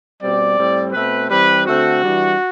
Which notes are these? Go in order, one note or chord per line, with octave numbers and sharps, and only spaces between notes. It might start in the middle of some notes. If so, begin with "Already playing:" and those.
B2 G3 C4 D5
A2 G3 C4
B2 A3 C4 B4
E3 G3 C4 B4
D3 A3 C4 F#4
E3 G3 D4